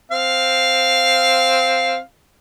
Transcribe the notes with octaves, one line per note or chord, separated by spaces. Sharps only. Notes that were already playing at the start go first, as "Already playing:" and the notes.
C4 F5